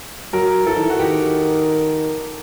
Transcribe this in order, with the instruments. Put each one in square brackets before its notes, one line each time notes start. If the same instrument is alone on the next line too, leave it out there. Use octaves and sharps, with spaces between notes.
[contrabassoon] F#3 [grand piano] A#4
[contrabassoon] E3 [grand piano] A4
[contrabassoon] D#3
E3
[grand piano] F#4
[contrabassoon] D#3 [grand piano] G4